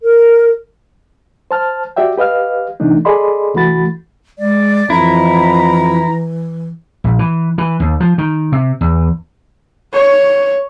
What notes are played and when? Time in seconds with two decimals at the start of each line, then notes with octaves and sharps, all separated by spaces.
0.02 A#4
1.51 C5 A5 F6
1.96 F#4 G4 D5 E5 G5
2.17 G4 B4 D#5 F5 F6
2.80 C3 E3 A3 D4 D#4
3.05 G#4 A4 D5 D#5 B5 C6
3.54 C2 E3 A3 F#4 B5 A6
4.39 G#3 D5
4.90 F2 E3 E4 A#5
7.04 A#1
7.19 E3
7.58 E3
7.80 D#2
8.00 F3
8.18 D#3
8.52 C3
8.81 E2
9.94 C#5